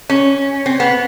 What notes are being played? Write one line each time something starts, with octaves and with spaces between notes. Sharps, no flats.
C#4
C4
B3